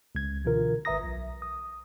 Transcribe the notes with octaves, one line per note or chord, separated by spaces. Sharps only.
C#2 G#6
B2 D3 E3 F4 A#4
G#1 B4 E5 A#5 D#6 A#6
B1
D#6